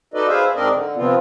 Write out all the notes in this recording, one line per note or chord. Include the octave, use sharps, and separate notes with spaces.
D#4 F#4 A4 B4 D5 D#5
G#4 B4 C5 E5 F5
G#2 C4 D4 A#4 D5 D#5
D3
C3 F3 B3 C4 F4